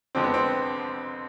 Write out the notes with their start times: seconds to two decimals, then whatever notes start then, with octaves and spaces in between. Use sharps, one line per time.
0.15 F2 D3 F3 G#3 C4
0.24 B3
0.34 C4